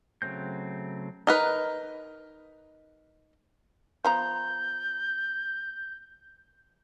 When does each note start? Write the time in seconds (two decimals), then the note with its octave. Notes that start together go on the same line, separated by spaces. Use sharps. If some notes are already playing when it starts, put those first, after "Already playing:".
0.22 C#3 F#3 A3 C4 G6
1.27 D#4 A#4 B4
4.05 F3 B3 A#5 G6